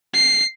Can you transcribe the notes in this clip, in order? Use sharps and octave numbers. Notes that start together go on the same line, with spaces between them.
C7